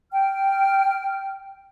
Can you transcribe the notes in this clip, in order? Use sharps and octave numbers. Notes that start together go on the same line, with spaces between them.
G5 F6